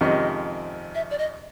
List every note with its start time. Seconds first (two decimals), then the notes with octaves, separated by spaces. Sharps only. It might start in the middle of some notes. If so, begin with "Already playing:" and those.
0.01 F2 C3 D#3 G#3 C#4 D#5
0.95 E5
1.11 D5
1.18 D#5